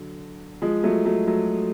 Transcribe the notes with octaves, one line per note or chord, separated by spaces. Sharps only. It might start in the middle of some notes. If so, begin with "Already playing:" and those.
Already playing: D3 F#3
F3 G#3
F#3 A3
F#3 A3
F#3 A3